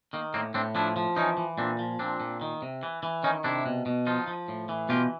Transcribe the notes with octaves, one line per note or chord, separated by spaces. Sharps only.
D#3 A#3
A2 A#3 C4
A2 C4 D4
F3 D4 E4
F3
E3 C#4 D#4
E3
A#2 C4 D4
F3
A#2 C4 D4
A#2
D#3
C3
E3
E3
D#3 C#4 D#4
C3 D4 E4
B2
B2
F3 D#4 F4
F3
A2
E3
B2 F4 G4